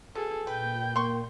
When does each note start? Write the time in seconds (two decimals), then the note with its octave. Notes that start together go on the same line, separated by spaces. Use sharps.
0.15 B2 G#4 A4
0.47 A#2 B4 G5 G6
0.96 A#3 C6 C#6